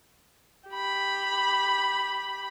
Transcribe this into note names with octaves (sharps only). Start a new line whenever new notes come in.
G4 B5